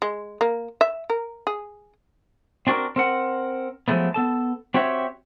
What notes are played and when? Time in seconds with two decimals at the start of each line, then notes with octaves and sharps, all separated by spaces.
0.02 G#3
0.41 A#3
0.81 E5
1.10 A#4
1.47 G#4
2.67 C4 D4 F#4 G#4 A#4
2.96 C4 A#4 F#5
3.88 F3 F#3 G#3 A3 B3
4.14 B3 A4 A5
4.74 C4 F#4 G4 C#5 E5